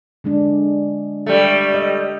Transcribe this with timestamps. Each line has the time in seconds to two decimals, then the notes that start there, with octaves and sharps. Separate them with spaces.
0.24 D3 G#3 D4
1.26 G3 A3
1.74 D#5